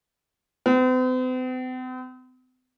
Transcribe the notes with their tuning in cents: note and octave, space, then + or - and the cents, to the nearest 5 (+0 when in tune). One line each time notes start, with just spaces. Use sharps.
C4 -45